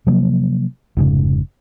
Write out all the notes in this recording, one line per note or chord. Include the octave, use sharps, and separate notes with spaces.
C3 F3 F#3 A#3
F1 G#2 C#3